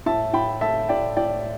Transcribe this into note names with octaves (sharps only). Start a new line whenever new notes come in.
A2 E5 A5
A2 G5 B5
A3 E5 A5
A2 D5 G5
A2 D5 G5